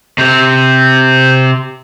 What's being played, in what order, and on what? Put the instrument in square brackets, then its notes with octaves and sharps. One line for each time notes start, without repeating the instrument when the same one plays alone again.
[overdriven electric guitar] C3 [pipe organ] G6